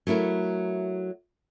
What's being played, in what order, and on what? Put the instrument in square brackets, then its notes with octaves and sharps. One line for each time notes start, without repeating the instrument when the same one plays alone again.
[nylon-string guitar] F#3 A3 E4 A#4